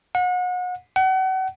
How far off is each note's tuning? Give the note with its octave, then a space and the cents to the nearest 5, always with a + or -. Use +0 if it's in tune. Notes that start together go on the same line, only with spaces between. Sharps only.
F#5 -35
F#5 +35